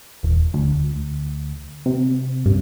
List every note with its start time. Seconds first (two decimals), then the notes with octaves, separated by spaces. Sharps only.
0.23 E1
0.54 D2
1.86 C3
2.46 G2